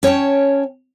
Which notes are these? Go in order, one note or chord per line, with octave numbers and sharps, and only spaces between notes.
C#4 C#5 D5 G5 A5